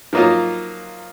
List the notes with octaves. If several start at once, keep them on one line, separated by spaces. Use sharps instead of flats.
F3 F#3 A#3 D#4 F4